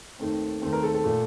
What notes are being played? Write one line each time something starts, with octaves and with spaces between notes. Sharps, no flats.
D#2 D#3 A3 C4
D#2 D#3 A3 C4
A#4
A4
A4
A#2 A3